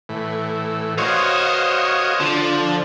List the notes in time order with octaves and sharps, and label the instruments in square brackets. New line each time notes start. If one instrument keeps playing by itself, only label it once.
[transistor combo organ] A2 E3
[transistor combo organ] F#4 D#5 F5 [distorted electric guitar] C5 C#5
[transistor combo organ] D3 [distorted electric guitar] F3